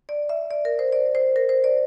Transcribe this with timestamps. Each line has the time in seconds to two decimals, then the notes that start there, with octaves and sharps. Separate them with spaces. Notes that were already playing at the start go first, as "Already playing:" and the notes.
0.09 D5
0.29 E5
0.51 D5
0.65 A#4
0.79 C5
0.92 D5
1.15 C5
1.36 A#4
1.49 C5
1.64 D5